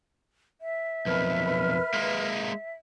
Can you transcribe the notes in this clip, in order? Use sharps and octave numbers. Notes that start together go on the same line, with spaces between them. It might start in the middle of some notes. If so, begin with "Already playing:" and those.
E5
B1 F2 A#4 B4 F6
G#3 A#3